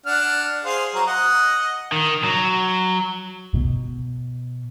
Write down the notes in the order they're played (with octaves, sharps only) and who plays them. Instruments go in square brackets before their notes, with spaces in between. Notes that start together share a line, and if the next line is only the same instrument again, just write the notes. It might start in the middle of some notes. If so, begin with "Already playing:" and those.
[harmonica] D4 F#5 F6
G#4 C5 F5
F#3 C5 A#5
D#5 F#5
[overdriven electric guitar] D#3
F#3
[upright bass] B2